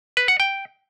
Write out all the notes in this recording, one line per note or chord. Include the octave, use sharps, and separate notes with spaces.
B4
F#5
G5